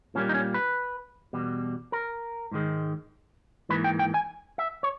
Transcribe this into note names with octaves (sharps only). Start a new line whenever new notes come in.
A#2 G3 A#3 C#4
D#4
C#4
B4
E2 B2 G3
A#4
G#2 D#3 G#3
G#2 E3 A#3 B4
G5
G5
G#5
E5
C#5